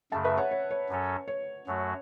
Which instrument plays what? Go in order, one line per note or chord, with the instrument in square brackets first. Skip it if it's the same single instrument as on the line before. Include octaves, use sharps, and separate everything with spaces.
[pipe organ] F#2 C#3 A3 [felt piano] E5 A5
[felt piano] B4 E5
C#5 F#5
C#5
C#5
[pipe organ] F#2 F#3 C#4 A4
[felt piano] C#5
[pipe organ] F#2 F#3 A3 F#4